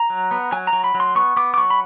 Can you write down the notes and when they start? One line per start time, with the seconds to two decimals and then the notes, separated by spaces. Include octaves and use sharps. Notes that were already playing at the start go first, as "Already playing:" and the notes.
Already playing: A#5
0.10 F#3
0.31 B3
0.52 F#3 G#5
0.67 A#5
0.73 F#3
0.84 B5
0.95 F#3
1.00 C6
1.15 B3 C#6
1.36 B3 D6
1.54 D6
1.58 F#3 C#6
1.70 B5